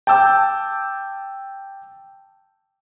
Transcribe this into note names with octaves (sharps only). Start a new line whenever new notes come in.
G5 A5 D6 E6 G6